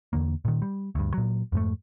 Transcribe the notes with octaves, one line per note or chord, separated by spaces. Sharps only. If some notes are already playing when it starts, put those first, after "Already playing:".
E2 D3 A#3
A#2 D#3
G3
D2 G2
A#2 F#3
F2 G#2 G#3 A3